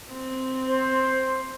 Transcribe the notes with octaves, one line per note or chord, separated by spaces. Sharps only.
C4
C5